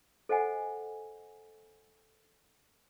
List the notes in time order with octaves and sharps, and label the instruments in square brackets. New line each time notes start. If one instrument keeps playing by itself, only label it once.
[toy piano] A4 C5 D#5 F#5 G#5